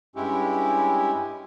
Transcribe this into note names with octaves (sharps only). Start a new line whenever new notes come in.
G2 G#3 C#4 E4 G4